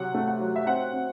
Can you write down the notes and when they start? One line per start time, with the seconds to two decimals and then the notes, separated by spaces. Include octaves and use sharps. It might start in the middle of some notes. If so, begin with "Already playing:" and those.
Already playing: C3 F#3 F#5
0.14 A3
0.28 F#5
0.40 F#3
0.56 E5
0.66 C4 F#5
0.93 C4